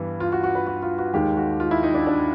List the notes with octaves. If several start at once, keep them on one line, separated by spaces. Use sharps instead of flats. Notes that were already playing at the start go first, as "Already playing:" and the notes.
Already playing: G2 E3 G3 B3
F4
F#4
F#4
B4
F#4
F4
F#4
D#2 D#3 G#3 G4
F#4
F4
E4
D#4
D4
D4